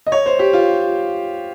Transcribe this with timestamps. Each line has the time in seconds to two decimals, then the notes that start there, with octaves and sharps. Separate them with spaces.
0.07 D#5
0.12 C#5
0.26 C5
0.39 G4
0.53 F4